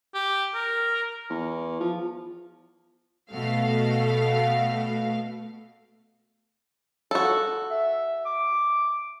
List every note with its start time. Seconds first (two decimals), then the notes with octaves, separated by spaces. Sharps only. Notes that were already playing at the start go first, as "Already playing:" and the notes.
0.14 G4
0.54 A#4
1.30 E2
1.80 F3
3.31 B2 A3 F5
7.11 F#4 A4
7.70 E5
8.26 D6